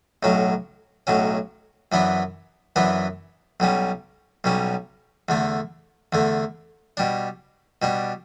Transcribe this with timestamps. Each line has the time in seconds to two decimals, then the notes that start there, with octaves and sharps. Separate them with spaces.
0.23 B1 A2 F#3 C#4
1.07 B1 A2 F#3 C#4
1.92 F#2 E3 B3 D4
2.76 F#2 E3 B3 D4
3.60 B1 B2 G3 C#4
4.44 B1 B2 G3 C#4
5.29 E2 D3 A3
6.13 E2 D3 A3
6.97 B2 G3 D4
7.82 B2 G3 D4